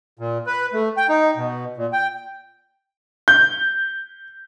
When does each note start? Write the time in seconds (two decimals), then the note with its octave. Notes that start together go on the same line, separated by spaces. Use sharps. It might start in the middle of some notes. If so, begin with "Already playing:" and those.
0.19 A#2
0.47 B4
0.73 A3
0.97 G5
1.09 D#4
1.36 B2
1.77 A#2
1.93 G5
3.28 G6